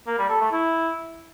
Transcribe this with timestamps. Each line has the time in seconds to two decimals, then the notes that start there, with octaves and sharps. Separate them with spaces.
0.07 A#3
0.18 G3
0.29 A4
0.41 A3
0.52 E4